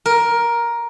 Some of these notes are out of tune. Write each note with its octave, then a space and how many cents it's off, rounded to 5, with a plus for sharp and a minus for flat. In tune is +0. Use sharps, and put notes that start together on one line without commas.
A#4 +10